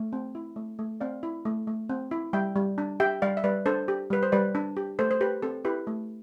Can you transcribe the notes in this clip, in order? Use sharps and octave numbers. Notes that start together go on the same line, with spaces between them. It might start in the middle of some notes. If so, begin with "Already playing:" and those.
Already playing: A3
C4
E4
A3
A3
C4 D5 F5
E4
A3
A3
C4
E4
G3 E5 G5
G3
D4
G4 E5 G5
G3 D5 F5
E5
G3 B4 D5
D4 A4 C5
G4
G3 B4
C5
G3 B4 D5
D4
G4
A3 A4 C5
C5
G4 B4
C4 A4
E4 G4 B4
A3